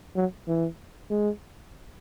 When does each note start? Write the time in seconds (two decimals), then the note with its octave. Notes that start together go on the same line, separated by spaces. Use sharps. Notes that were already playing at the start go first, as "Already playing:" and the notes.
0.16 F#3
0.48 E3
1.10 G#3